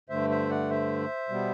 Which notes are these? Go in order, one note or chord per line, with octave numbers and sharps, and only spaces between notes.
G2 D3 A3 C5 E5
C5 E5
D5 F#5
C5 E5
B2 G3 B3